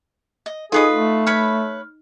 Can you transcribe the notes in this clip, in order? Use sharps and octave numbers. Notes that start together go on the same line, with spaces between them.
D#5
D#4 F4 G#4 A4 B4 D#5 D#6 C7
A3
B4 C#5 B5 F6